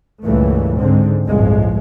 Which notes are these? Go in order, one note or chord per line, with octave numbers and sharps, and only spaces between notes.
C#2 G2 A#2 E3 A3
G#2 D3 G#3 C4
G1 C2 A2 F3 G#3